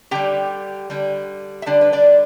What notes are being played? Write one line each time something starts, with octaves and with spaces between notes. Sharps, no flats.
D3 G3 G4 G5
D3 G3
E5
D3 G3 D4 D5
B4
D4 D5